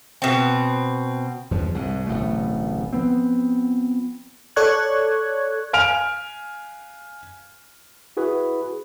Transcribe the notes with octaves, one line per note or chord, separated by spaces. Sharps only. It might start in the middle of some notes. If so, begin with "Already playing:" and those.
B2 C4
D#1 E2 G2 F3
C2 G#2
D1 A1 B2 A3
F3 B3 C4
A4 C#5 D5 C#6 F#6 G#6
F5 G#5 F6 D7 F7
E4 F#4 G#4 B4